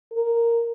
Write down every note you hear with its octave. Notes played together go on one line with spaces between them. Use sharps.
A#4